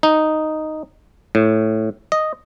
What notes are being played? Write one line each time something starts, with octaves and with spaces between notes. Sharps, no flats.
D#4
A2
D#5